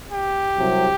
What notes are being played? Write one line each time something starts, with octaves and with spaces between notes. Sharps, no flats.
G4
C2 C3 F#3